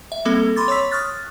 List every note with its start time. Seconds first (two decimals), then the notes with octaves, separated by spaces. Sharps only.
0.12 E5
0.25 G3 A#3 C4 A4
0.56 B5 C6 D6 A6
0.68 C#5 C6 C#6 E6 B6
0.91 C#6 D#6 F6 F#6 A6